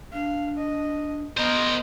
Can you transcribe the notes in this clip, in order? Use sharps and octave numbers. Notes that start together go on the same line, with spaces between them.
D4 F5
D#5
B3 A#4 C5 D#5